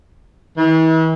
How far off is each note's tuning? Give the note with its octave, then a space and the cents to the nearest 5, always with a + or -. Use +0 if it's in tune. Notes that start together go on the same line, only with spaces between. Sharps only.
E3 -40